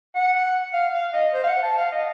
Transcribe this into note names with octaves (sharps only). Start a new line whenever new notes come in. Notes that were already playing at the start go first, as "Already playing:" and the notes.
F#5
F5
F5
D#5
C5
F5
F#5
A5
F5
D#5